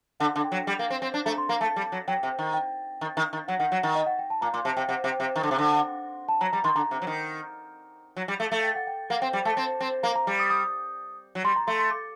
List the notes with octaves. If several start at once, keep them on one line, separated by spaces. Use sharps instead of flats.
D3 F#5
D3
G5
F#3
G3
A#3
C4
C4
D4
A3 A#5
C6
A#3 A#5
A3 A5
G3
F#3
F#3 G5
C3
D#3
G5
D#3
D#3
D#3
F#3 F#5
D#3 F#5
F#3 F#5
D#3 F#5
D#5
F#5
G5
A5
A#2 A#5
A#2 C6
C3 A5
C3 G5
C3 F#5
C3
G5
C3
D#3
D3
C3
D3
A5
F#3 A#5
G3 A#5
D#3 C6
D3 A#5
C3
F#3
D#3
F#3
G3
A3
A3
G5
F#5
G5
A#3 F#5
C4 G5
G3 G5
A3 A5
C4
C4
A#3 A#5
A#5
G3
D#6
D#6
F#3
G3 C6
A#5
A3 C6
C6
D6